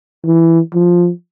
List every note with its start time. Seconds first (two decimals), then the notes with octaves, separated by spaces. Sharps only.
0.24 E3
0.74 F3